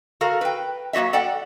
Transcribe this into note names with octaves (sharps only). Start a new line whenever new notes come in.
F#4 A4 A#4 F5
B4 G5
F#3 A#3 F#4 D#5 E5
A4 D5 F#5 G5